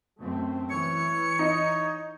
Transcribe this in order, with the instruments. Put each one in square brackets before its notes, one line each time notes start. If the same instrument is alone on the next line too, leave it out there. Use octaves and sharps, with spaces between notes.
[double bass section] F#2 A3 C4
[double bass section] E3 [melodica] C#5 [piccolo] C#7
[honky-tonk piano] D#4